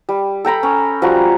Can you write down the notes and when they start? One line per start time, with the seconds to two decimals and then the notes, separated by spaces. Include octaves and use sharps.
0.09 G3
0.45 A4 G5 A#5 B5
0.63 C#4
1.02 F3 G3 F#4 A#5